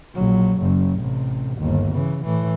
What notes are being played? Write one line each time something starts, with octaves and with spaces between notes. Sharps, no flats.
A#1 F#3
F#1 F#2
A1 C3
G1 D#2
C#3 E3
A2 E3